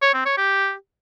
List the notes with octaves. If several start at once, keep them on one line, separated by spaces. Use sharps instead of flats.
C#5
C4
C#5
G4